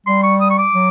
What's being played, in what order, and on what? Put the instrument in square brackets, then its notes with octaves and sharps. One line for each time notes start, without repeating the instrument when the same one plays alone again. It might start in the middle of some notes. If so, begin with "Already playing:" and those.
[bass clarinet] G3 [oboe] C6
[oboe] C#6
D#6
C#6
D6
[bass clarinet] F#3